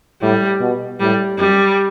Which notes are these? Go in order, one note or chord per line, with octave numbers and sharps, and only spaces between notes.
A2 G3
B2
A2 G3
F#2 G3